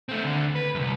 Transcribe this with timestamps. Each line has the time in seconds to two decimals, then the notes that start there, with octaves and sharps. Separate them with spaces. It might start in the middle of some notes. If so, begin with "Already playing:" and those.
0.09 A3 C4
0.25 D2 D3
0.56 B4
0.75 C2 F#2